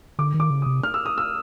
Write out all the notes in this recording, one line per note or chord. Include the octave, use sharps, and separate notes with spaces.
D3 D6
D#3
D6
C#3
D#6
C3
F6
E6
D#6
E6